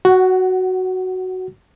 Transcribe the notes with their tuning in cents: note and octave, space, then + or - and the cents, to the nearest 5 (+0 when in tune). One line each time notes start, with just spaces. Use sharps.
F#4 +5 F#5 +25